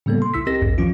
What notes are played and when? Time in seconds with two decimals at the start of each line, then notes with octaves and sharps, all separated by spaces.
0.06 A2 C#3 G3 A#3 B3 A4
0.22 C6
0.34 C2 E4 E6 B6
0.47 C4 G4 A#4 D#5 A#6
0.62 A#1 E2 G2
0.78 E3 F3 C#4 F4